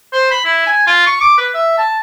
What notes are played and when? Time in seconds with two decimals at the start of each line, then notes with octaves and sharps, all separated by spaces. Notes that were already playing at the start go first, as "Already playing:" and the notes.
0.13 C5
0.31 B5
0.45 E4
0.67 G#5
0.87 F4
1.06 C#6
1.21 D6
1.38 B4
1.54 E5
1.78 A5